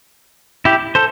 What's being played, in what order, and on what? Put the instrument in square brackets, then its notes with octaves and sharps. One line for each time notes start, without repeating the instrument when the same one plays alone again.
[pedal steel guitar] E4 G4
A4 C5